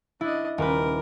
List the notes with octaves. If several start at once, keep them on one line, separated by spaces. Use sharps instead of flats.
D4 E4 D#5
D#1 A#4 B4